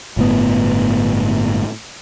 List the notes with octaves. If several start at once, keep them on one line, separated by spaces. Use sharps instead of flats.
G1 A2 B3